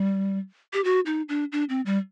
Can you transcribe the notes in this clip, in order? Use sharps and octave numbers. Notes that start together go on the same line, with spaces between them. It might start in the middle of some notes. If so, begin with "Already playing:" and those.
Already playing: G3
G4
F#4
D#4
D4
D4
C4
G3